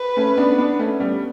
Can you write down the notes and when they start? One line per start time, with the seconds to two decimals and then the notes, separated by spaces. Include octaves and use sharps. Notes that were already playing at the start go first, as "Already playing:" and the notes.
Already playing: B4
0.17 A3 C#4
0.37 B3 D4
0.58 B3 D4
0.79 A3 C#4
1.00 G3 B3